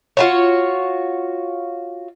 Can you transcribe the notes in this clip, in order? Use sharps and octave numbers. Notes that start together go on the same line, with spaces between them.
F4 F#4 C#5